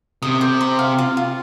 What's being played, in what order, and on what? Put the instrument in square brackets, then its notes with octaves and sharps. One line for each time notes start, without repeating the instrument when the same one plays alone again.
[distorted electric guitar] C3 [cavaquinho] D#6
[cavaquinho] C5
C6
F5
F4
F4